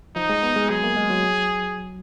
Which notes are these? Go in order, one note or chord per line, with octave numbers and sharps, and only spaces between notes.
F3 D#4
G#3
B3
G#3
F#3 G#4
A#3
G#3
F#3